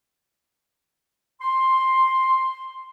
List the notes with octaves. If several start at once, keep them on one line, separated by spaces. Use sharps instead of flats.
C6